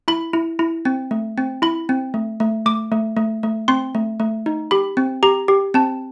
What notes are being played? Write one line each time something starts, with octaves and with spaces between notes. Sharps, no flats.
E4 B5
E4
E4
C4
A3
C4
E4 B5
C4
A3
A3
A3 D6
A3
A3
A3
C4 C6
A3
A3
D#4
G4 B5
C4
G4 A#5
G4
C4 A5